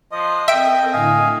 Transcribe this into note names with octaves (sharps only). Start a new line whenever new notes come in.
F3 D#5 C6 F#6 C7
C4 A4 A#4 D#5 E5 G5 D7
A2 D3 E4 D#5 F5 G#5